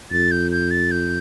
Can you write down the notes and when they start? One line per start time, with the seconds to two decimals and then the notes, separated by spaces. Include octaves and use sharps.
0.11 F2 A6
0.31 G6
0.51 G6
0.71 A6
0.91 G6